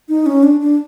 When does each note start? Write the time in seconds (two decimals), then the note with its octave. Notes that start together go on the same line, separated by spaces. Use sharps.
0.09 D#4
0.26 C#4
0.43 D4
0.60 D4